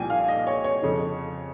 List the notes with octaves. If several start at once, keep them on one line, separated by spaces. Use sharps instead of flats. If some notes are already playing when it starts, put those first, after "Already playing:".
Already playing: C2 A#2 F3 G5 G#5
F5
D#5
C#5
C#5
F2 C#3 F3